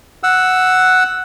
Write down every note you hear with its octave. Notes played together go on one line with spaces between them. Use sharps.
F#5 E6